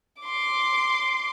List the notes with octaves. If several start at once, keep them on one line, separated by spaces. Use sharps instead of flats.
C6 D6